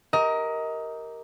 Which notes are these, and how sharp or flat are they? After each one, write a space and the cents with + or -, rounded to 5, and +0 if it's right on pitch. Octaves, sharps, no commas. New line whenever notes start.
G4 +0 A#4 +0 D#5 +25